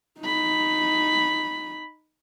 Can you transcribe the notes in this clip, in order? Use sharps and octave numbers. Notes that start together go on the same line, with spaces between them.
D#4 B5